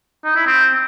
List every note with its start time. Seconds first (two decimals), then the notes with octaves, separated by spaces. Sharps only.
0.24 D#4
0.36 E4
0.47 C4